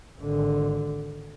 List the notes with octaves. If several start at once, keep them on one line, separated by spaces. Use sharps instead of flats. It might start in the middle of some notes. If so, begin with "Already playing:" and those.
G#1 D3